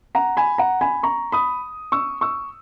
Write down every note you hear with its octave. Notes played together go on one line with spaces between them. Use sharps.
F#5 A#5
G#5 B5
F#5 A#5
G#5 B5
A#5 C#6
B5 D#6
C#6 E6
C#6 E6